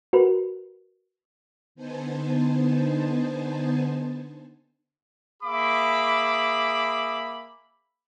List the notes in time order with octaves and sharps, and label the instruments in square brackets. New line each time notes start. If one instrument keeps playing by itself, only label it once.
[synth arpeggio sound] F#4 A#4 B4
[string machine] D3 B3 D#4 C5 G#5 A5
[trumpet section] A#3 G#4 E5 B5 D6